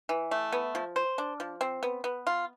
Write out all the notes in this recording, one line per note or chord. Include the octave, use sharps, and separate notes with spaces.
E3
A3
B3
F3
C5
D4
F3
C4
B3
B3
F4